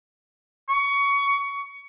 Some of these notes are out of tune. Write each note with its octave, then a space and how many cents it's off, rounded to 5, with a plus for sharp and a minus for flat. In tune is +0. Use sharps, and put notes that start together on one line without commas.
C#6 +20